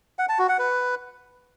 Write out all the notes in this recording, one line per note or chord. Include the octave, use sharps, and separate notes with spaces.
F#5
A5
F#4
F#5
B4